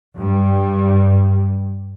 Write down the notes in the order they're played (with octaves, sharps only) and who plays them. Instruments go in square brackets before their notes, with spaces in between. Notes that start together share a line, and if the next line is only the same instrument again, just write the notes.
[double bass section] G2 G3